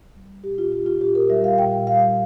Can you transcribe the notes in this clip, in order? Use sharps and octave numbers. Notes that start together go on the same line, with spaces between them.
G3
A#2 G4
F4
G3 G4
F4
A#2 G4
A#4
G3 E5
F5
A#2 G5
G3 F5